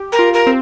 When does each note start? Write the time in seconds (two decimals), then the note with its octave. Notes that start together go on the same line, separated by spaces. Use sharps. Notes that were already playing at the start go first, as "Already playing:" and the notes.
Already playing: G4
0.12 A#4
0.19 F4
0.33 A#4
0.47 C4